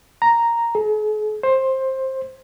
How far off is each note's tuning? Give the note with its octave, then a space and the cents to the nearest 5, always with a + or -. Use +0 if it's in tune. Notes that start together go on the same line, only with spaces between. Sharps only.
A#5 +0
G#4 +45
C5 +15